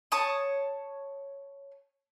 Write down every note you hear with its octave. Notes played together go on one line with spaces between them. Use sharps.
C#5 A5 C#6 D#6